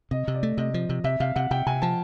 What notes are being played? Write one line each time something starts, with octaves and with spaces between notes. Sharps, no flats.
C3 D#5
C3
D5
A3
C3 D#5
F3
C3
C3 E5
C3 F5
C3 F#5
C3 G5
C3 G#5
F3 A5